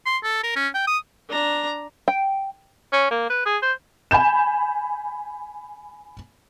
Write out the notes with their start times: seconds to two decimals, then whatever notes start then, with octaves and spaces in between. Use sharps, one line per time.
0.06 C6
0.23 A4
0.43 A#4
0.56 C#4
0.74 G5
0.87 D#6
1.29 D4 A#5
2.08 G5
2.93 C#4
3.11 A#3
3.30 B4
3.46 G#4
3.62 C5
4.11 G#5 B5 G6 E7